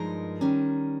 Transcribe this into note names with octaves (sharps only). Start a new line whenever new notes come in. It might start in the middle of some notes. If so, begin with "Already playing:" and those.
Already playing: G2 F3 G#3 D#4 A#4
D#3 G3 C#4